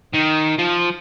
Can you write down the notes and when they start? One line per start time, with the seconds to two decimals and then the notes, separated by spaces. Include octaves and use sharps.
0.14 D#3
0.59 F3